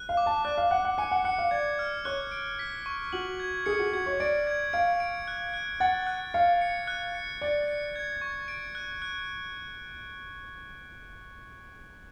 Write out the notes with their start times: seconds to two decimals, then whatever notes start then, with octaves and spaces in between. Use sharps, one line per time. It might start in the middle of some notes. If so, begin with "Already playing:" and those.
Already playing: F#6
0.09 F5
0.17 D6
0.26 A5
0.45 D5 F#6
0.58 F5
0.71 F#5 F#6
0.85 F#5
0.98 G#5 C#7
1.11 F#5
1.25 F#5 C#7
1.38 F5
1.51 D5 G#6
1.79 F6
2.05 C#5 F#6
2.32 D7
2.59 B6
2.86 C#6
3.12 F#4 F#7
3.40 G#6
3.66 G#4 C#7
3.79 F#4
3.93 F#4 G#6
4.06 C#5
4.20 D5 D7
4.47 G#6
4.73 F5 D7
5.00 D7
5.28 F#6
5.54 F#6
5.80 F#5 A6
6.07 F#6
6.34 F5 C#7
6.62 C#7
6.88 F#6
7.15 C#7
7.41 D5 C#7
7.68 C#7
7.96 G#6
8.21 C#6
8.48 D7
8.75 F#6
9.02 F#6